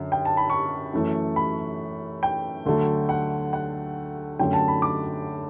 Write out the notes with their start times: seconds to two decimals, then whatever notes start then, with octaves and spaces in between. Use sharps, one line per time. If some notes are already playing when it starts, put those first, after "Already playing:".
Already playing: F#2 D3
0.12 G5
0.25 A5
0.37 B5
0.50 C#6
0.93 F#2 E3 A3
1.36 B5
2.23 G5
2.66 D2 D3 F#3 A3
3.09 F#5
3.53 F#5
4.39 F#2 D3 F#3 A3 G5
4.53 A5
4.68 B5
4.82 D6